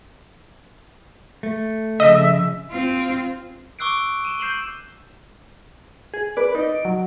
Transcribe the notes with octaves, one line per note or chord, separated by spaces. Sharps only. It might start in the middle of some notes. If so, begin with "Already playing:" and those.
A3
C#3 F3 D#5 E5
C4 F4
C#6 D6 E6 F#6 C7 D7
D#7 E7 G7
G6 C7 E7 F#7 G7
G#4
B4 D5
D#4 D5 D#5
D7
F#3